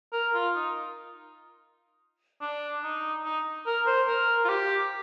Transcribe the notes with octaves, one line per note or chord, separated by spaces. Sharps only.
A#4
F4
D#4
D4
D#4
D#4
A#4
C5
A#4
F4
G4